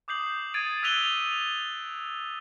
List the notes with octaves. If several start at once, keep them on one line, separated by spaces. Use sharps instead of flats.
D6 D#6 G6 C7 F#7
D#6 G#6 A6 D7 D#7
E6 F#6 B6 D#7 F7 G7